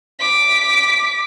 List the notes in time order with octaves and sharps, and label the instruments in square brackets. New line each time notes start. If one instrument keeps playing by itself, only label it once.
[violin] D6 B6